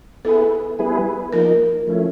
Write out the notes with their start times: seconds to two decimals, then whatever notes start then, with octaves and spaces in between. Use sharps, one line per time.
0.25 B3 E4 G#4 A4 B4
0.79 G3 B3 E4 G#4 B4
1.33 F3 A#3 D#4 A#4
1.87 F3 A3 C#4 E4